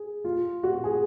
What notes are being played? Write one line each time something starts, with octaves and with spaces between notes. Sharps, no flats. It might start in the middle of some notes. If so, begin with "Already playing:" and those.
Already playing: G#4
F4
F#4
G#4